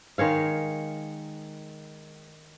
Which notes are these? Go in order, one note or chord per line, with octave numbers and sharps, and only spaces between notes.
D#3 G#3 C#5 F5